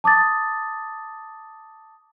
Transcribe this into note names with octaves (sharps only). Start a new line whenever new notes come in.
A5 D6 D#6 A6